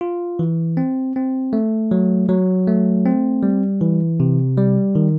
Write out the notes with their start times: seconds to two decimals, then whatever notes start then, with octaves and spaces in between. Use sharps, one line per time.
0.01 F4
0.39 E3
0.77 C4
1.16 C4
1.53 A3
1.91 F#3
2.29 F#3
2.67 A3
3.06 C4
3.43 G3
3.81 E3
4.20 C3
4.58 G3
4.95 D#3